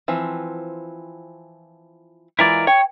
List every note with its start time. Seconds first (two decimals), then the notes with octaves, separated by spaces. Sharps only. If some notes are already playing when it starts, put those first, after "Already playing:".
0.08 E3 F3 C4
2.39 E3 G#3 E4 F4 A#4 D5
2.67 C#5 G5